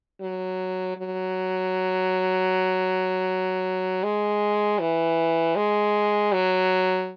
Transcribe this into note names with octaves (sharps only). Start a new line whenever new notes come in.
F#3
F#3
G#3
E3
G#3
F#3